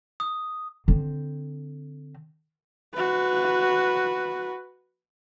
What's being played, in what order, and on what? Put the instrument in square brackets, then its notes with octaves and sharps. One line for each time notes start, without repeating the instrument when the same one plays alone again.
[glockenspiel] D#6
[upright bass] D3 C4
[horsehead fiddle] F#4 B4